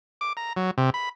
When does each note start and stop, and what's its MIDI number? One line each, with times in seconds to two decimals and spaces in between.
0.21 0.33 86
0.37 0.53 82
0.57 0.71 54
0.78 0.90 48
0.94 1.09 83